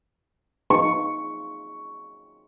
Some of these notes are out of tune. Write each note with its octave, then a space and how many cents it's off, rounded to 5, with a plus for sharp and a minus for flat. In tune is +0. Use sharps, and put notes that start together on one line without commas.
C#6 +5